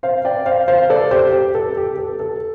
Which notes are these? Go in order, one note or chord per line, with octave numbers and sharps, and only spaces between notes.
C5 F5
D5 G5
C5 F5
C5 F5
A4 D5
G4 C5
G4
A4
G4
A4
A4